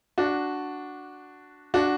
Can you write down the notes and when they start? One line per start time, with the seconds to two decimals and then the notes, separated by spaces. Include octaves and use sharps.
0.18 D4 F#4
1.74 D4 F#4